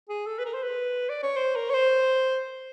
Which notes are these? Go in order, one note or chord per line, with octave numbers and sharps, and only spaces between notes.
G#4
A4
B4
A#4
C5
B4
D5
C#5
C5
A#4
C#5
C5